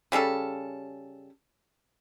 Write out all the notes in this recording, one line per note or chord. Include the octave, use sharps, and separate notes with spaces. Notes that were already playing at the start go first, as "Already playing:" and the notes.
C#3 G3 C#4 A4